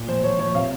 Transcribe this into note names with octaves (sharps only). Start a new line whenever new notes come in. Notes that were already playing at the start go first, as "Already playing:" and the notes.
Already playing: A#2
F3 C5
F3 C#5
F3 C#5
C3 F5